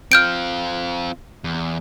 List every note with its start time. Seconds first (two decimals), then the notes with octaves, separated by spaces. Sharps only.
0.12 C4 F4 F6 G6 D7
1.44 E2